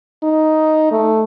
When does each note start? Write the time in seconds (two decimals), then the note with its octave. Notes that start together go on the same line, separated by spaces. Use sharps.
0.23 D#4
0.92 A3